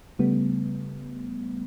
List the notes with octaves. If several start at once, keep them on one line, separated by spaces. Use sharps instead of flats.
C#3 G3 A3 B3